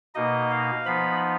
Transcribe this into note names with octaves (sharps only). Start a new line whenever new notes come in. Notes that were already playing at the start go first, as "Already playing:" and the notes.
B2 A#3 D#4 D#5
F5
F3 B3 D#4 B5